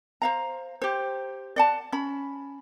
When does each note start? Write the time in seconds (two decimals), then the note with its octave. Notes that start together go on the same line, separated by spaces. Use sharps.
0.22 C5 F5 A#5
0.82 G4 C5
1.56 D5 F#5 A5
1.92 C#4 B5